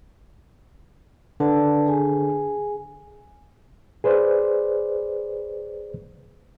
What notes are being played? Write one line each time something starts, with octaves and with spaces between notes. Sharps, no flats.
D3 B4 D5 A5
G#4 G#5
G#4 B4 C5 D5